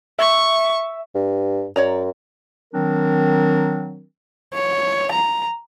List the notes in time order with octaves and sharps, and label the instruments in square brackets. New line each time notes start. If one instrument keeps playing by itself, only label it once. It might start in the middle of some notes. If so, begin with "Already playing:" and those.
[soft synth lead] E5 [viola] C#6
[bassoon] G2
[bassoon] F#2 [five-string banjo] C#5 D5 A#5
[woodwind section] D#3 F#3 C4 D4 A#4
[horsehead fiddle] C#5
A#5